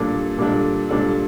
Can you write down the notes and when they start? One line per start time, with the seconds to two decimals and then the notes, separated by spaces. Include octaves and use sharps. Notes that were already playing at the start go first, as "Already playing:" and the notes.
Already playing: A#2 G3 D4 A4
0.38 A#2 G3 D4 A4
0.89 A#2 G3 D4 A4